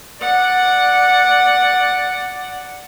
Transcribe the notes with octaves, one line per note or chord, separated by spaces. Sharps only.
D5 F#5